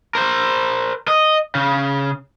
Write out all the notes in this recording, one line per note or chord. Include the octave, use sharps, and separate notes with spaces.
A#4 C5
D#5
C#3